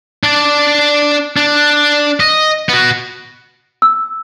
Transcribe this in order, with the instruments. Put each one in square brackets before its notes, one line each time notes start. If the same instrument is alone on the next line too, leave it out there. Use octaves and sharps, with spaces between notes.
[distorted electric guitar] D4 D5
D4
D#5
B3 F#4
[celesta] E6